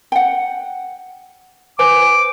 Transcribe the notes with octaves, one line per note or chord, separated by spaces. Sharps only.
F#5 G5
B4 C5 G#5 D6